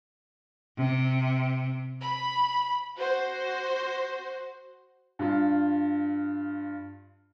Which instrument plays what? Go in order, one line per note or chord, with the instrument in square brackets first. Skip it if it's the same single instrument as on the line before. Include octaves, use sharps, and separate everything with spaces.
[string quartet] C3
B5
[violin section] F#4 C5
[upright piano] G2 F4